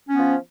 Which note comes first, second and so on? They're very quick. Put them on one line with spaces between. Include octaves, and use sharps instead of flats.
C#4 B3 F3